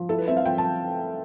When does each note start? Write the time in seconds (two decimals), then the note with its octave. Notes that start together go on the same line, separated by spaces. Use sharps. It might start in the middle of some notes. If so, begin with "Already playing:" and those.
Already playing: F3
0.09 E4 A4
0.18 B4
0.28 C4 E5
0.37 F5
0.45 F3 G5
0.58 A5